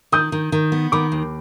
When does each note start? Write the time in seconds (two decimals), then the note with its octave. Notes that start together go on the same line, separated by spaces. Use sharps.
0.12 D#3 D#6 G6
0.32 D#3
0.52 D#3
0.72 B3
0.92 D#3 B5 D6
1.12 D#2